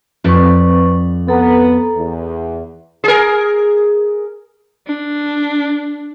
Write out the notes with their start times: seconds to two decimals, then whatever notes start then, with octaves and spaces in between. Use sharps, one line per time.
0.24 F2 C4 B4 D5 C#6
1.28 B3 A4 A#5
1.96 E2
3.04 G#4 A#4
4.87 D4